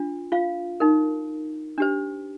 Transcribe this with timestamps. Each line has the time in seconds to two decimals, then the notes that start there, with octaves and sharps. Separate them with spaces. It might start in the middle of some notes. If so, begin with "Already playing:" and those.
Already playing: D4 F4
0.32 F4 F5
0.80 D#4 A#4
1.78 D4 G4 C5